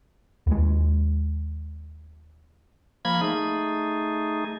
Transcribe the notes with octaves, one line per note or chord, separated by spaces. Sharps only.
D#2 G#3
F3 A#3 B5 G#6
A3 D#4 G#4